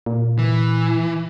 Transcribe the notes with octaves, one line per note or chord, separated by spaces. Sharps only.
A#2
E3